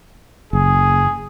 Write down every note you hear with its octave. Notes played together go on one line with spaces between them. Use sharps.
F#1 G#4